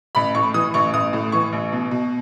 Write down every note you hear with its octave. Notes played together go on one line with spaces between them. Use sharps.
A1 B5
A2 C#6
E3 D#6
A1 C#6
A1 D#6
A2
E3 C#6
A1
B2
B2